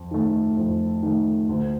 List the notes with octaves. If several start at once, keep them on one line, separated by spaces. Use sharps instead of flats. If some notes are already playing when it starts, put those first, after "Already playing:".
Already playing: F2
D#3 A3
F2
D#3 A3
D2